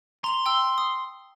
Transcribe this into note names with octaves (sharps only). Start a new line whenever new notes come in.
A#5 C6 F7 F#7
G5 E6
D#6